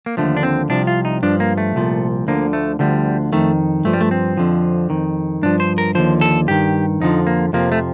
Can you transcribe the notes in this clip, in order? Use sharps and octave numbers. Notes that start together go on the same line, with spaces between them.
A#3
D#2 D3 F3 A3
D4
C4
C2 C3 F3 D4
F4
D#4
G2 F3 D4
A#3
A3
C2 A#2 F3
D2 D3 F3 A#3
A3
D2 D3 F3 G3
F2 D#3 A3
G2 F3 A3
G3
A3
C4
F2 D3 F3
F2 D#3
G2 F3 D4
C5
A#4
D#2 D3 F3 C5
A4
G2 D#3 G4
F2 D3 F3 D#4
A#3
F2 C3 F3 A#3
A3